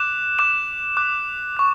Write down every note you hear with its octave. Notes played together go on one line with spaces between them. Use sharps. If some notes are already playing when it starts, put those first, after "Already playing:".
Already playing: D6 F#6 E7
D6 F#6 E7
D6 F#6
C#6 F#6